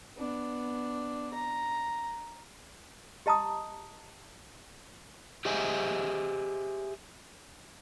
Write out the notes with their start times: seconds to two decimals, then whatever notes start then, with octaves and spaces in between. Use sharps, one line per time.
0.17 B3 D4
1.34 A#5
3.26 G4 D#5 A5 A#5 D#6
5.45 G4 G#4 C5 D#5 E5 G#5